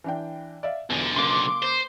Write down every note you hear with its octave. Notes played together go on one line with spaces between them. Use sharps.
E3 D4 G5
D5 E5 F5
B1 E2 D3
C#2 A#3 C6 D6
C5